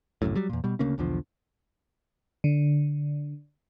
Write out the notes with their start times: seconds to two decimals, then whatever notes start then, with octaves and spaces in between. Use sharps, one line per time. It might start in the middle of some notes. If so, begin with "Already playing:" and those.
0.22 G1 C2 F#2 A2
0.36 F#3 G3
0.49 E2 A#2
0.64 B2 G3
0.79 D2 C#3 A#3 C#4
0.98 B1 E2 D3 F3
2.44 D3